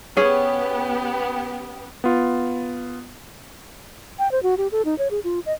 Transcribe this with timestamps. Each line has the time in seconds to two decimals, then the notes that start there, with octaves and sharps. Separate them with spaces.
0.17 B3 C#4 G4 G#4
2.04 B3 F4
4.19 G5
4.32 C5
4.43 F#4
4.58 G4
4.72 A4
4.85 D#4
4.98 C#5
5.11 G#4
5.24 F4
5.46 D#5